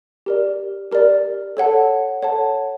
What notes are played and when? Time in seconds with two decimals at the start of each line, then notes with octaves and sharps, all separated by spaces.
0.26 G4 A#4 D5
0.92 G4 A#4 D5
1.57 A4 C#5 F#5 A5
2.22 A4 C#5 F#5 A5